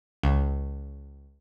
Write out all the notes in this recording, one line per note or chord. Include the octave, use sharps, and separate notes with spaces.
C#2